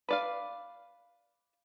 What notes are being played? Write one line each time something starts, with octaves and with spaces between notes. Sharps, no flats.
B4 D5 F5